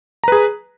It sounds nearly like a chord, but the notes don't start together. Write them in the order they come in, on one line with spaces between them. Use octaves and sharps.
A#5 B4 G#4